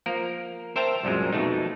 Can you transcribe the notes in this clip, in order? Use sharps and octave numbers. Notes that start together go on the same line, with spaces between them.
F3 A#3 A#4
A#4 C5 E5 G5 A5 A#5
C2 F#2 A#2 G#3
F2 B2 A3 D#4